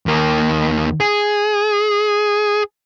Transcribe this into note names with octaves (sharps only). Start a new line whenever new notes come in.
D#2 A#3
G#4